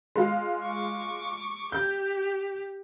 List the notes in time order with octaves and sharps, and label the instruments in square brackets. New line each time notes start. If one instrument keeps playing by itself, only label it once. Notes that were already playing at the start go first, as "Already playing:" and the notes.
[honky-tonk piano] G#3 F4
[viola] C#6 D6
[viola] G4 [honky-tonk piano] G6